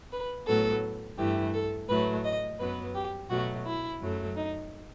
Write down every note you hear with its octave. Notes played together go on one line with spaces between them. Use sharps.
B4
A2 F#3 B3 A4
G2 E3 A3 G4
A4
A2 F#3 A3 B4
D#5
F#2 F#3 B3 B4
G4
B2 F#3 A3 F#4
E4
F#2 F#3 A3
D#4